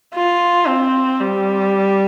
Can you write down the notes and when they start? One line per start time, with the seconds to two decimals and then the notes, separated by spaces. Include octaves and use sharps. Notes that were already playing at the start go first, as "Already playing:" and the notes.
0.14 F4
0.68 C4
1.20 G3